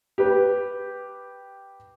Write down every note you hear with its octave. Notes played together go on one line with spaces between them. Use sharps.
G4 B4